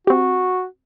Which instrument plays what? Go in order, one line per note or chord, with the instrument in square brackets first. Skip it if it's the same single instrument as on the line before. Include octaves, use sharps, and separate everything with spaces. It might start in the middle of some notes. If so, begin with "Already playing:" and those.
[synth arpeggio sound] C4 G4 [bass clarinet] F#4